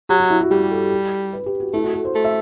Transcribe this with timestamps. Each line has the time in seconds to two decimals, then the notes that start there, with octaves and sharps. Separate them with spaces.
0.09 F#3 G4
0.20 F#4
0.30 E4
0.41 F#4
0.51 G3 G4
0.71 A4
1.33 B4
1.46 G4
1.60 F#4
1.73 A3 E4
1.84 F#4
1.94 A4
2.05 C5
2.15 A3
2.24 E5